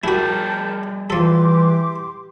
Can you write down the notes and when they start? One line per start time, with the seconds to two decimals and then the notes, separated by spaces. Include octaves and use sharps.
0.04 G3 E4 F#4 G#4 A#4 G5 A5 G6
1.10 E3 F3 G4 A4 C6 D6